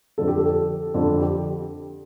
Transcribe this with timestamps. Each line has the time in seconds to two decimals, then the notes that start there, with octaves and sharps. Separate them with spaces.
0.18 F2 D3 A4
0.28 G4
0.38 A4
0.94 F2 D3 A4
1.20 G4